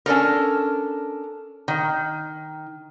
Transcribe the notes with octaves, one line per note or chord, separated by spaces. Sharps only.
C#4 D4 A4 A#4
D#3